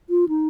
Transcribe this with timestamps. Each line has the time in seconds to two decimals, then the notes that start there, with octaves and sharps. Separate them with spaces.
0.10 F4
0.29 D#4